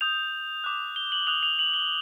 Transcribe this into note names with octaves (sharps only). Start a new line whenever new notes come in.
D#6 G6 F7
D6 F#6
G7
F#7
D#6 F#6 F7
F7
F#7
G7